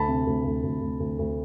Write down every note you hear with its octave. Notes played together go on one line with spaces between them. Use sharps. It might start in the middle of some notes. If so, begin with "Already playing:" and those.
Already playing: D2 A5 B5
C3
D2
D2
D2
D2
D2
D2